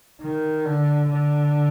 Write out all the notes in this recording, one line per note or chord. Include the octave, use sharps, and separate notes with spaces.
D#3
D3
D3